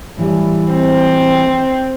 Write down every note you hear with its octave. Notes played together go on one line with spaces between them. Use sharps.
A2 E3 G3
C4